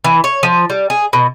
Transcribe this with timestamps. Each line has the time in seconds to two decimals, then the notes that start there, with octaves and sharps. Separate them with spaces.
0.04 E3
0.24 C#5
0.43 F3
0.70 G3
0.90 G#4
1.13 B2